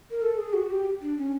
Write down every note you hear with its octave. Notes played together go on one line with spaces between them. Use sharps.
A#4
A4
G#4
F#4
G4
D4
C#4